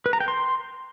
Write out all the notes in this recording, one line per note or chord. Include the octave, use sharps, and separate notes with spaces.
B4
A#5
G5
C6